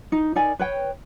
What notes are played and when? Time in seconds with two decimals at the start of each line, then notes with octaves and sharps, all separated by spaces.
0.12 D#4
0.36 D#4 A#4 D5 G#5
0.59 B4 C#5 G5